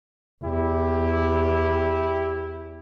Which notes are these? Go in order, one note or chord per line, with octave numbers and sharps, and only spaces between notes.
E2 E4 G4